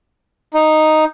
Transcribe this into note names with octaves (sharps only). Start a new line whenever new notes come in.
D#4